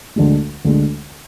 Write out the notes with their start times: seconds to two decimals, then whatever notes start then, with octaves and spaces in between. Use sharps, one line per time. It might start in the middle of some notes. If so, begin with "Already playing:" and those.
0.16 D2 D3 G#3
0.65 D2 D3 G#3